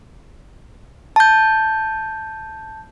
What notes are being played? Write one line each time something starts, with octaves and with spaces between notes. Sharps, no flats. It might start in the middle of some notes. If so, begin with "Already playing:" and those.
A5 G6